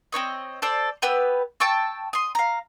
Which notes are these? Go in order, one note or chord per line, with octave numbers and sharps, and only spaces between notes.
C4 D#4 C#5 D#5
A4 C5 D5
B3 G4 B4 E6
G5 A5 C#6 E6
C6 D#6
F5 A#5